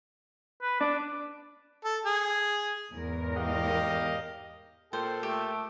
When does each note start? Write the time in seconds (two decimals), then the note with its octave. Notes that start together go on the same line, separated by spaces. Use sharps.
0.62 B4
0.81 D4 D6
1.84 A4
2.06 G#4
2.94 E2 G#2 A#4
3.35 G4 D#5 F5
4.93 A#2 A4 C5 G5
5.23 A3 G4